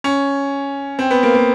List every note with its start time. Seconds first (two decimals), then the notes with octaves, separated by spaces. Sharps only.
0.04 C#4
0.99 C4
1.11 B3
1.23 A#3
1.35 A#3